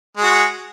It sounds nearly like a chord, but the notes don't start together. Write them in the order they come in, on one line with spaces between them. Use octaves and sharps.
G#3 G#4 F#4